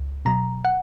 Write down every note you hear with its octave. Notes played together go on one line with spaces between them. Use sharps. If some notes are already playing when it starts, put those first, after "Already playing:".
Already playing: C#2
B2 F#3 A#5
F#5